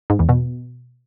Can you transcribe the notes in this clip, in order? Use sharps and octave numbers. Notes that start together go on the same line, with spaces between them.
G#2
E2
B2